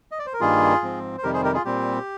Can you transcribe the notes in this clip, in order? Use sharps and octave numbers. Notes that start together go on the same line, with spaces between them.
D#5
D5
C5
A#4
G2 D#3 G3 A#3 F4 G#4
G#2 F3 C4
C5
F2 C3 D#3 G3 G4 A#4
G#4 C5
G4 A#4
F4 G#4
A#2 G3 C4 G4